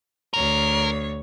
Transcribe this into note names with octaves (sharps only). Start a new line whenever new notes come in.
D2 A#4 C#5